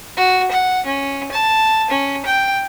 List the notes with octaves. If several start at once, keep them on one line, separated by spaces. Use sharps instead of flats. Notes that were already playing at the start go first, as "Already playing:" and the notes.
F#4
F#5
C#4
A5
C#4
G5